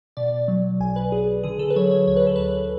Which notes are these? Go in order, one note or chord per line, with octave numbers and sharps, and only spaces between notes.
B2 D5
F#3
B1 G#5
B4
B1 G#4
D3 G#4
A4
B4
F#3 C#5
C#5
D2 C#5
B4
A4
D2 B4